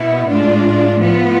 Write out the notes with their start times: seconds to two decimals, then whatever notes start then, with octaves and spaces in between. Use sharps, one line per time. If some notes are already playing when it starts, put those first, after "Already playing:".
Already playing: B2 B3 E4
0.27 A2 G#3 D4 F4
0.96 A2 F3 B3 F4